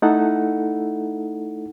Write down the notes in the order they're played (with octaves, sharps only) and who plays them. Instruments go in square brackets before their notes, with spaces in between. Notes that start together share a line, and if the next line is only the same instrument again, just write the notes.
[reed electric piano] A3 D#4 E4 A4 F#5